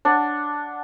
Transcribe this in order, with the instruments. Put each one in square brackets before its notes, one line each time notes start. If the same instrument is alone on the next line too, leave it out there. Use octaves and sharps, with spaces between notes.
[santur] D4 F#5